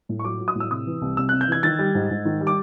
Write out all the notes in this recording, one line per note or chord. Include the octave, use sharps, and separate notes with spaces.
A2
C#6
F#3 D6
F#3
D#6
A2
E6
C3 D#6
E3
C2
C2 E6
C3 F#6
G6
E3 G#6
D#3 A6
G3
G#2
G#2
D#3
G3
D6